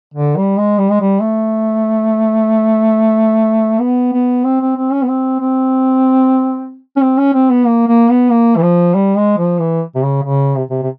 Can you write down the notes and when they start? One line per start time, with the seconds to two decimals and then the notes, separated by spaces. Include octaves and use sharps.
0.14 D3
0.36 G3
0.58 G#3
0.79 G3
0.91 G#3
1.01 G3
1.22 A3
3.79 B3
4.13 B3
4.44 C4
4.61 C4
4.77 C4
4.92 C#4
5.03 B3
5.09 C4
5.40 C4
6.97 C#4
7.02 C4
7.18 C#4
7.34 C4
7.50 B3
7.66 A#3
7.88 A#3
8.10 B3
8.30 A#3
8.57 E3
8.62 F3
8.95 G3
9.17 G#3
9.38 F3
9.59 E3
9.95 C3
10.02 C#3
10.23 C#3
10.56 C3
10.70 C3
10.83 C3